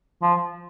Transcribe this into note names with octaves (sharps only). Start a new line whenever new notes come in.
F3